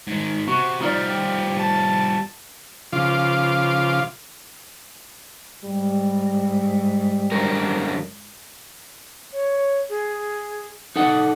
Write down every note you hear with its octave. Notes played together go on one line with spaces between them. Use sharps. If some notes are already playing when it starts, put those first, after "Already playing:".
G#2 D#3
C3 F#4
F3 G3 D#4 F4 D5
G4
A5
C#3 F3 F4 F5 D6
G#2 G3
F#2 D3 A#4
C#5
G#4
D#4 A4 F#5 D#6